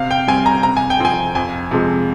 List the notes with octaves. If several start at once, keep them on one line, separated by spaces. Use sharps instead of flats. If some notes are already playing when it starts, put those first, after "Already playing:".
Already playing: C3 F5
G5
G3 C4 G#5
A#5
C3 A#5
G#5
G5
F3 C4 G#5
F2 G#5
C3 F3 G#3